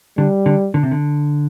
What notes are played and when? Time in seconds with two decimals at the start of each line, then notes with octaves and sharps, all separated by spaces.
0.18 D3 G3
0.46 D3
0.74 D3
0.83 C3
0.91 D3